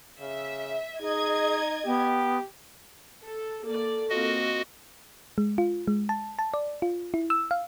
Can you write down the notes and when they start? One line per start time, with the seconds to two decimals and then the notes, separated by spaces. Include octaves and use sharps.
0.20 C#3 E5
1.00 D#4 G#4 D#5 G#6
1.85 B3 G4
3.25 A4
3.64 A#3 A4 D5
4.10 A#3 C4 F4 F#4 D#5
5.38 G#3
5.58 F4
5.88 G#3
6.09 A5
6.39 A5
6.54 D5
6.82 F4
7.14 E4
7.30 E6
7.51 F5